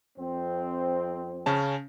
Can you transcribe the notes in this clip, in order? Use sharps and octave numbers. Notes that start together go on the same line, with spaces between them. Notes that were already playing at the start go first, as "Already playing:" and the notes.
F2 C4
C#3 C#4 A5